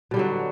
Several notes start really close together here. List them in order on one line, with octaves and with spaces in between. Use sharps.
B2 G3 D3 F#3